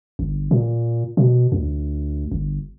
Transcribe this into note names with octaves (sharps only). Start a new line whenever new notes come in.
G1
A#2
B2
D2
G1